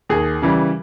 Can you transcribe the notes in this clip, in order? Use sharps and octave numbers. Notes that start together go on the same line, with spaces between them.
D#2 G#4
C#3 E3 G3